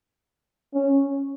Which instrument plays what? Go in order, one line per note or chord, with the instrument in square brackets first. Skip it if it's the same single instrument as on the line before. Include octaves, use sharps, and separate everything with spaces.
[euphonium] C#4